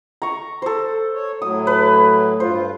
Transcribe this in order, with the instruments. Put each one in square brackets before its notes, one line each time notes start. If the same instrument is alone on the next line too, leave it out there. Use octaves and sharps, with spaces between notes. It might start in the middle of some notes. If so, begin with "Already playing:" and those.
[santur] A#5 C#6
A4 C5
[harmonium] C#5
[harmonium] A2 F#3 [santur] D#6
[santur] B4
[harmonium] G2 F4 [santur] C5